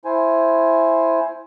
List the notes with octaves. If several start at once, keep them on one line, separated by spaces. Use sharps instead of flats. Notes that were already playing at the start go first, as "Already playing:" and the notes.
E4 C5 G#5